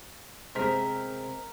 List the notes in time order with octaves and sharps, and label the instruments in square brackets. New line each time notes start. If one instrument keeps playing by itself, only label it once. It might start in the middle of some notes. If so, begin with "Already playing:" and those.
[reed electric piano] C3 G#4 C6 [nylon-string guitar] G#3 C4 [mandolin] A#4 [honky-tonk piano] C5 B6